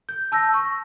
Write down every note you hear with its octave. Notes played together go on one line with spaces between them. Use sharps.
G6
A5 E6 G6 A#6
C#6